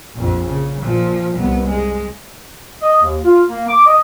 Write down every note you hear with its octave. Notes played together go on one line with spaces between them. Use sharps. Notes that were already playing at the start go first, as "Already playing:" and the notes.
A#1 F2
C#3
A#2 F3
C2 B3
G#3
D#5
D#2
F4
A#3
D6
D#5